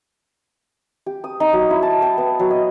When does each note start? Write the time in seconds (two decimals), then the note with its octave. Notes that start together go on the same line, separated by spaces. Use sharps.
1.06 G4
1.24 D#6
1.40 D#4
1.53 F#3
1.70 E4
1.83 A5
2.02 G5
2.18 B3
2.39 F#3
2.51 D#5